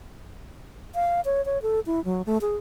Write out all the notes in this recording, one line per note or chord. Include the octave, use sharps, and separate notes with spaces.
F5
C#5
C#5
A4
E4
F#3
A3
G#4